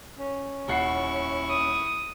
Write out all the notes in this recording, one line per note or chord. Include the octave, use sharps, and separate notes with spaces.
C#4
D#1 E4 F#5 C#6 C7
D#6